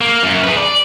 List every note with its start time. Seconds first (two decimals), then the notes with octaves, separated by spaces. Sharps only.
0.01 A#3
0.23 F#2
0.44 G#4 B4
0.57 D5